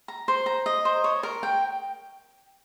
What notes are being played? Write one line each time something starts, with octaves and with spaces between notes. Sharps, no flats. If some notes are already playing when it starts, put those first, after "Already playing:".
A#5
C5
A#5
D#5
C5
C#5
A#4
G5